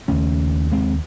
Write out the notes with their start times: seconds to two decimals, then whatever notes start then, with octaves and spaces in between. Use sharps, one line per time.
0.08 D#2 C#3 A3 C#4
0.72 G#3 C4